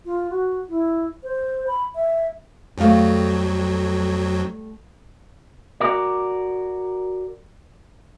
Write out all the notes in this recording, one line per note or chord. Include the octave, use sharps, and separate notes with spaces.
F4
F#4
E4
C5
B5
E5
F2 F#3 G3 A3 F5
F#4 A#4 D5